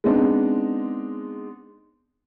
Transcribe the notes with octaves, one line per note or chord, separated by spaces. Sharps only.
G#3 B3 C4 D4 D#4